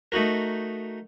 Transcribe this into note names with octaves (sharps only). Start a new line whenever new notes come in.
A3 D#4 F#4 A#4